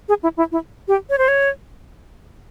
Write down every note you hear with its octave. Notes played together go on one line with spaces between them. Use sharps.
G#4
E4
E4
E4
G4
C#5
C5
C#5